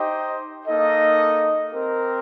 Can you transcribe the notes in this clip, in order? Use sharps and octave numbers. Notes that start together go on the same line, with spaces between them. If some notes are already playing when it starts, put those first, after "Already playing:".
Already playing: D#4 G4 C5 D#5 G5
A#3 D#4 A4 D#5
C4 G4 A#4